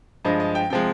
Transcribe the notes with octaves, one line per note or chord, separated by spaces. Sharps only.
G2 F3 G#3 D#5
D#5
G5
C3 F3 G#3 G5